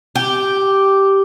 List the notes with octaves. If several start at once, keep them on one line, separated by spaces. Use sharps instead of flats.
G4